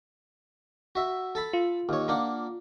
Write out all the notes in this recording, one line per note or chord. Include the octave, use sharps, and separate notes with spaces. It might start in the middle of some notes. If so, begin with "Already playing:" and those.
F#4 E5
A4 A5 B5
F4
D#2 C#5
A#3 D4 F#5